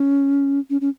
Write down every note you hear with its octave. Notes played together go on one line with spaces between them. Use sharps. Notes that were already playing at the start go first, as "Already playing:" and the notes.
Already playing: C#4
C#4
C#4